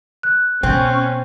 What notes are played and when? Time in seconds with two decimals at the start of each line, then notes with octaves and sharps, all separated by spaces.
0.23 F#6
0.63 B2 C4 C#4